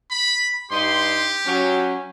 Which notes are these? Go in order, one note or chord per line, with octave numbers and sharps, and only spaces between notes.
B5
G2 D#4 G4 C6
F#3 C#4